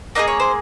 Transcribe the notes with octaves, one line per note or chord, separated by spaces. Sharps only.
A#3 D#4 G#4 D#5
C#5
C5